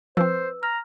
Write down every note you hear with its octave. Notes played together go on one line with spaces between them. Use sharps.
F3 C4 B4 C5 E6
A#5 F6